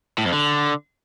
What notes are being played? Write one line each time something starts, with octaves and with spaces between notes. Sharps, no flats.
A2
F2
D3